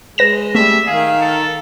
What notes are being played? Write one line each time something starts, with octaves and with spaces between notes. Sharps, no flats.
G#3 G#4 B4 A#6 E7
G3 A3 E5
D#3 G#4 F5
A4